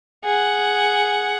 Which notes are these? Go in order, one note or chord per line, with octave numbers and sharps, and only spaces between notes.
G#4 F#5